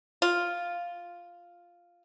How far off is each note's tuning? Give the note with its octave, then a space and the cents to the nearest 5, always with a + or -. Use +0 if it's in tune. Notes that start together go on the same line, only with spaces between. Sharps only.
F4 +0